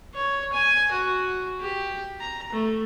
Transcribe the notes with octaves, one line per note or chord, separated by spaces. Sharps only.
C#5
G#5
F#4
G4
A#5
A3